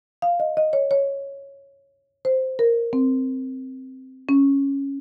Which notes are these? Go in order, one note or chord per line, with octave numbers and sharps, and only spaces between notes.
F5
D#5
D#5
C#5
C#5
C5
A#4
C4
C#4